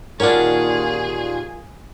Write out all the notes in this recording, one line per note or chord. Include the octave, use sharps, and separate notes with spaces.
D#2 A#2 C#4 D4 F4 F#4 G#4 A#4